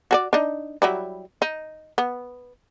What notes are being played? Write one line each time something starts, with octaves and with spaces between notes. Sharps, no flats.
F#4 G#4 D5
D4 D#4
F#3 G3 E4
D#4
B3